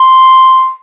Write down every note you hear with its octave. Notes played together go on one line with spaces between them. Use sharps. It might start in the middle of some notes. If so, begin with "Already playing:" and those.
Already playing: C6